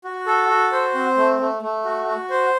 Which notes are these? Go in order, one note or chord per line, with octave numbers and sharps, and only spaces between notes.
F#4
A4
F#4
C5
C4
A3
A3
A3
F#4
F#4
C5